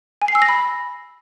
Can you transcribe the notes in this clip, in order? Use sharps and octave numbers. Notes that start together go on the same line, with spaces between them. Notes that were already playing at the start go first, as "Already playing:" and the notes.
G#5
C7
E6
A#6
B5